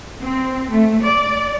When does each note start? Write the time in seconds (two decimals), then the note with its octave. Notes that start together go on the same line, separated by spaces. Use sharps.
0.21 C4
0.71 A3
1.03 D5